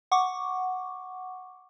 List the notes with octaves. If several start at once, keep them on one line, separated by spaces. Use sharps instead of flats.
F#5 C#6 D6